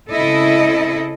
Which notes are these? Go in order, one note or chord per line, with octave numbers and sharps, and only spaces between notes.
C#3 G#3 C4 E4 A4 D#5